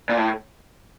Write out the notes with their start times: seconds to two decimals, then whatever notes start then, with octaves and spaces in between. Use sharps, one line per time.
0.09 A#2
0.17 A2